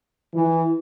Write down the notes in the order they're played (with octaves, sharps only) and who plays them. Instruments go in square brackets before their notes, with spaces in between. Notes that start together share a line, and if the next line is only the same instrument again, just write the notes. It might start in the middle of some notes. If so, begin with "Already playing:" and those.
[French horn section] E3